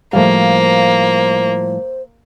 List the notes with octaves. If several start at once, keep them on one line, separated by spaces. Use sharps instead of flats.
A2 F3 G3 A3 A#3 C5 F5